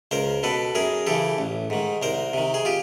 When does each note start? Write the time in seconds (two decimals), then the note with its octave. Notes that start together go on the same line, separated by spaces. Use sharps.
0.11 C#2 A#4 C5
0.43 B2 A4 B4
0.75 F#2 G#4 A#4
1.07 C#3 E3 G4 A4
1.38 A1
1.70 G#2 D#3
2.02 C2 A#4 C5
2.34 C3 D#3
2.54 G#4
2.65 F4 G4